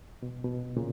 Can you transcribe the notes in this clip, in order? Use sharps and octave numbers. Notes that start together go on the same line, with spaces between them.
B2
B2
A#2 C#3